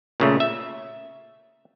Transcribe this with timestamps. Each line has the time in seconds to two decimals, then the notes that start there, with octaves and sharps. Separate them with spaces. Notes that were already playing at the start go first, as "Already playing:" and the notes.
0.20 A#2 C#3 A3
0.40 E5